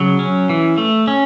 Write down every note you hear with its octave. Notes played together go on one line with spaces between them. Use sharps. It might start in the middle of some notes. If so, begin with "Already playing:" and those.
Already playing: C#3 F#3
C#4
E3
A3
C#4